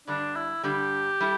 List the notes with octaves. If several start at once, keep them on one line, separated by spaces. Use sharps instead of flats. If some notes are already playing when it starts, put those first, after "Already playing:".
G2 D3 G3 D4
E4
G2 D3 G3 G4
G3 E4 A4